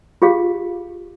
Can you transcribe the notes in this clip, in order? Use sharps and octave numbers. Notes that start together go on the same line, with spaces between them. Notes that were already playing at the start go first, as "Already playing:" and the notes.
F4 G4 G#4 F5